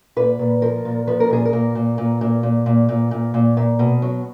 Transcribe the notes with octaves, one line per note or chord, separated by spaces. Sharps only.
A#2 B4
A#2
F3 A#4
A#2
F3 B4
A#4
A#2 G#4
A#4
A#2
A#2
A#2
A#2
A#2
A#2
A#2
A#2
A#2
A#2
B2
F#3